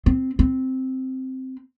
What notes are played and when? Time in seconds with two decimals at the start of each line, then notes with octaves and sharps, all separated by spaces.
0.06 C4
0.39 C4